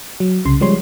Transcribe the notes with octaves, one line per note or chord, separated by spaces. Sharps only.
F#3
C2 C#3 C6
F3 G3 G#3 C#5 C6